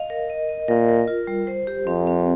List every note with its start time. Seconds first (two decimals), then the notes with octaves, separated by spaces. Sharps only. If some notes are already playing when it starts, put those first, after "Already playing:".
Already playing: D#5 F5
0.10 A#4
0.30 D#5
0.49 D#5
0.68 A#2 A#4
0.88 A#4
1.08 F4
1.27 G3
1.47 C5
1.67 G4
1.86 F2 C4
2.07 C4